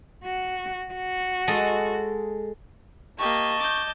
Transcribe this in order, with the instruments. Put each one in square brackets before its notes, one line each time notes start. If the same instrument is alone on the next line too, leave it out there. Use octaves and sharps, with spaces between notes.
[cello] F#4
F#4
[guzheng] G#3 A4 D#5
[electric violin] A#3 G4 [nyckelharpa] D#5 A5 [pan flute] C#6
[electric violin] D6 G6